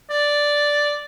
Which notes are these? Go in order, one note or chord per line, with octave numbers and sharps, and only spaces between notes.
D5